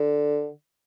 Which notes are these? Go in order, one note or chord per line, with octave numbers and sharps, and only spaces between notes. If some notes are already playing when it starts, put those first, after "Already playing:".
Already playing: D3